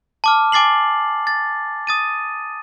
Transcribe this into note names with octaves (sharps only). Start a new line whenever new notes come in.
A5 D6 F6
G#5 D6 A6 C7 F#7
A6
D#6 A6 D#7